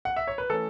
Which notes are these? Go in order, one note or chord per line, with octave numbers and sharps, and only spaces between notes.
F#5
E5
C#5
B4
E3 A3 C#4 A4